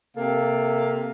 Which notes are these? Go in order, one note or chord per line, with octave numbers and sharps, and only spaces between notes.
C3 A#3 A4 F5